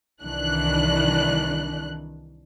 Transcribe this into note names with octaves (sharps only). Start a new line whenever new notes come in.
C2 D#3 E3 D4 F#6